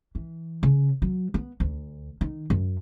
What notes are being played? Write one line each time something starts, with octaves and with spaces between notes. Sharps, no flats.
E3
C#3
F#3
B3
D2
D#3
F#2